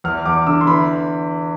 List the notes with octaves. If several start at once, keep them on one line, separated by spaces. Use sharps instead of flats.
E2 F6
E2 D6
D3 E6
C6
E3 B5